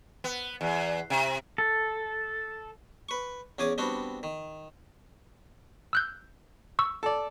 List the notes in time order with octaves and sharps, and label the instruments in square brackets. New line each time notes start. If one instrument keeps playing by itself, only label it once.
[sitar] B3
E2
C3
[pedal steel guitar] A4
[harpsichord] B4 C#6
E2 C#4 G#4 D6 D#6
G3 B3 C4 D4 F#4
D#3
[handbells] E6 F#6 G6
C#6 E6
[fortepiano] A4 D5